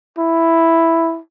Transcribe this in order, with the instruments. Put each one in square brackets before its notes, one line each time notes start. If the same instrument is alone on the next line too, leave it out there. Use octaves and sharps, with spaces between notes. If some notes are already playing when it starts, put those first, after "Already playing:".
[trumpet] E4